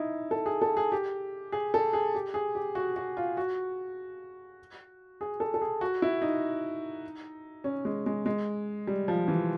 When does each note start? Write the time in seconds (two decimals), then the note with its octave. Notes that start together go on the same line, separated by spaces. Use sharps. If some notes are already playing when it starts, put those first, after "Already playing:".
Already playing: D#4 E4
0.31 A4
0.46 G#4
0.62 A4
0.77 G#4
0.92 G4
1.52 G#4
1.74 A4
1.93 G#4
2.15 G4
2.34 G#4
2.55 G4
2.75 F#4
2.96 F#4
3.17 F4
3.37 F#4
5.21 G#4
5.40 A4
5.54 A4
5.62 G#4
5.81 F#4
6.02 E4
6.22 D#4
7.64 C#4
7.85 G#3
8.06 G#3
8.26 G#3
8.87 G3
9.08 F3
9.28 E3